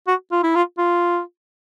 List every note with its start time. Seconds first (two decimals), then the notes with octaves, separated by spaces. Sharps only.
0.07 F#4
0.32 F4
0.43 E4
0.55 F4
0.78 F4